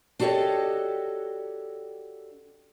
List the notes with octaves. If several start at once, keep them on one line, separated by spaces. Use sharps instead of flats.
D4 F#4 G4 A4 C#5 D#5